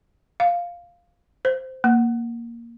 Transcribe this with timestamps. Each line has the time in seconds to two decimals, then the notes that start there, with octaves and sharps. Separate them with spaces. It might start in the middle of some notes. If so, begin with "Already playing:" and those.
0.40 F5
1.45 C5
1.84 A#3